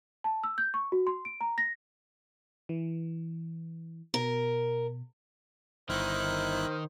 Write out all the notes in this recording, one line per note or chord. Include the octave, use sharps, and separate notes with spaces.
A5
E6
G6
C#6
F#4
C6
D7
A#5
A#6
E3
B2 A#4
G1 D#3 D#4 E4 C5 F6 F#6